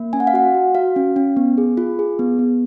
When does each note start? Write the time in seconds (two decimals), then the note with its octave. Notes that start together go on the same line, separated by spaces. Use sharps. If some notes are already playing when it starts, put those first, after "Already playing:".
Already playing: A#3
0.13 C#4 G#5
0.20 F#5
0.27 F5
0.34 F#4 F#5
0.55 F#4
0.75 F#4 F5
0.96 C#4
1.16 C#4
1.37 B3
1.58 G#4
1.77 F4
1.99 G#4
2.19 B3
2.39 B3